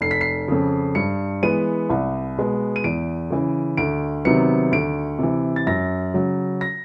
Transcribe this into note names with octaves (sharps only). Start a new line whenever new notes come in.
F1 C7
B6
C7
F2 C#3
G2 C#7
E3 G#3 B3 D#7
C2
B2 G#3 B3
D#7
E2 D7
C#3 E3
D2 D7
C3 D#3 F#3 B3 C#7
D2 D7
C3 E3
A6
F#2 A#6
C#3 F#3
A#6